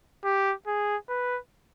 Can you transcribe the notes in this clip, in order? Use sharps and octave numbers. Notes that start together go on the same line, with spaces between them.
G4
G#4
B4